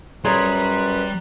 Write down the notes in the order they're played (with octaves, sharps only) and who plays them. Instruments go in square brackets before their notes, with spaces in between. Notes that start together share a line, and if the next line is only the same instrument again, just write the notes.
[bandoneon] F#2 B4 [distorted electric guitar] G3 [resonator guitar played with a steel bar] G#4 C#5 D5 [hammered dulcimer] A#5 C6